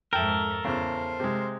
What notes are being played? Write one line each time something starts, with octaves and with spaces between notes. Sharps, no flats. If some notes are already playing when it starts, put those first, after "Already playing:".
F2 G#2 A4 A#4 E5 G5
E2 C#3 C5
C3 G#3